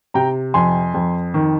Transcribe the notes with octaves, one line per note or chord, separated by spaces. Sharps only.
C3 G5 A#5
F2 G#5 C6
F2
D#3